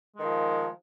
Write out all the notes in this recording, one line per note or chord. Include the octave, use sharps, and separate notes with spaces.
D#3 F3 G#3